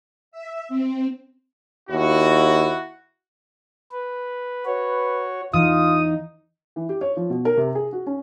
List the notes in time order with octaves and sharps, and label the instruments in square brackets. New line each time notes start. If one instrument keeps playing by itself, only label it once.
[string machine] E5
C4
[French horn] D#2 [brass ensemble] E4 F#4
[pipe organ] B4
[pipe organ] F#4 C#5 [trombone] B4
[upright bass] E2 E3 [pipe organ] D#4 [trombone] F4 [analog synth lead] D#6
[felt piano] E3
G4
C#5
F3
B2
A#4
C3
G#4
F#4
C#4